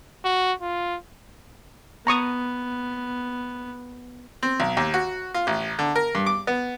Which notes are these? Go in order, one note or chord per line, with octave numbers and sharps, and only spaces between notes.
F#4
F4
B3 A#5 C#6 D#6
C4
B1
D#2
F#4
F4
A1
D3
A#4
G2
D6
B3